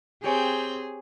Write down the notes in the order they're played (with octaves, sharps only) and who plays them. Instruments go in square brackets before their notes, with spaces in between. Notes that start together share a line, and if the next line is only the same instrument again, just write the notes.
[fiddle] C4 G5 [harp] G4 C#5 G#5 [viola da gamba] G#4